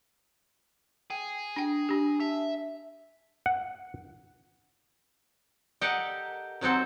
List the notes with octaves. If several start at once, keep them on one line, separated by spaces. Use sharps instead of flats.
G#4 G5
D4 G5
D4 G4
E5 A5
F#5
G4 A4 A#4 D#5 F#5
D#3 F#3 C4 A4 C5